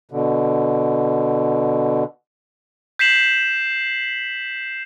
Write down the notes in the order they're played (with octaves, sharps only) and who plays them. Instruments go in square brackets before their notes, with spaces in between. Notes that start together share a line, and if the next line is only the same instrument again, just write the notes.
[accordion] B2 D3
[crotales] G6 B6 C7 E7 F#7